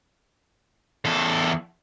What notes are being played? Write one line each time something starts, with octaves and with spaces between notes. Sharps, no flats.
E2 A4